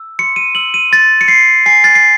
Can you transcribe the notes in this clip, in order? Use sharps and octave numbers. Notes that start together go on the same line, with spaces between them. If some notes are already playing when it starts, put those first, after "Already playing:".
Already playing: E6
C6 C#7
D#7
E6 F#7
D#7
C6 A6
C#7
C6 C7
G#5 C7
A6
C7